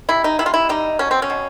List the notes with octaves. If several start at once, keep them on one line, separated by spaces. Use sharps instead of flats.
C3 E4
D#4
C3 E4
F4
E4
G3 D#4
B2 C#4
C4
C#4
B2